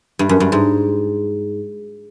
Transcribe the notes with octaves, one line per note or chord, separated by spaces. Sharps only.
G2
F#2
G2
G#2